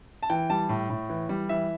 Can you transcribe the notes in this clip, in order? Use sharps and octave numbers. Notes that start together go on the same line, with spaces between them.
A5
E3 G5
G3 A5
A2
A2
E3
G3
E3 E5